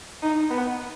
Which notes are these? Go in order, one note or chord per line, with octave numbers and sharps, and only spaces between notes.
D#4
B3